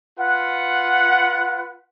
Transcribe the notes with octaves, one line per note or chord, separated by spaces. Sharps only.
F4 B4 F#5